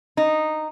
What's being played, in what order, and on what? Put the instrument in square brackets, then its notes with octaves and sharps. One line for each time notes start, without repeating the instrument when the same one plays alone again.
[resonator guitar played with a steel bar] D#4